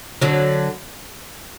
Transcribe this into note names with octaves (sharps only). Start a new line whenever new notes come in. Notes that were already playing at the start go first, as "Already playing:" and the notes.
D3 F#3